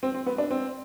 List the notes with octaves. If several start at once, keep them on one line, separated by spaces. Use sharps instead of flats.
C4
C4
B3
D4
C4